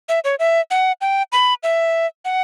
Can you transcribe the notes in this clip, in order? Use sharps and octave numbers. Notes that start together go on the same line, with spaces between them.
E5
C#5
E5
F#5
G5
B5
E5
F#5